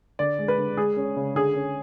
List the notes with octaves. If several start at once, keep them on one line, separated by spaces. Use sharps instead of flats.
D3 D5
G#3
B4
D3
G#3 G#4
C#4
C#3
D3 G#4
C#4